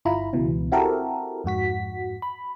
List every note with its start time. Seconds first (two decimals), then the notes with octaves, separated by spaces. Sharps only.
0.05 G1 E4 F4 A#5 B5
0.33 C#2 B2 E3
0.72 C4 E4 F#4 G4 A4 A#4
1.44 F2 G#2 F#4 B6
2.22 B5